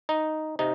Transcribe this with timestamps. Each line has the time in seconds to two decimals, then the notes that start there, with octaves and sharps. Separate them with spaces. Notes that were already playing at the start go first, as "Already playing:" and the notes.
0.09 D#4
0.59 C3 D#4